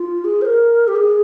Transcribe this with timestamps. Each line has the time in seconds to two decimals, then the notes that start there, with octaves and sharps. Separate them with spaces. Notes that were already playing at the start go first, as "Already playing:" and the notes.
Already playing: F4
0.24 G#4
0.41 C5
0.45 A#4
0.87 G4
0.95 G#4